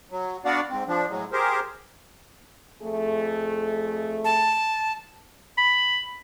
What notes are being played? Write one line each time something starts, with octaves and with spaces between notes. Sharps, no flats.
F#3
B3 D4 F#4 D5 F5 F#5
G#2 C4
F3 D4
A2 F#3 G#3
G4 G#4 A#4 C5
F2 A3 G#4
A5
B5